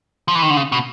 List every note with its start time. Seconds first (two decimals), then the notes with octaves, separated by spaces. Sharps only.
0.28 F3
0.35 E3
0.42 D#3
0.50 D3
0.57 C#3
0.72 B2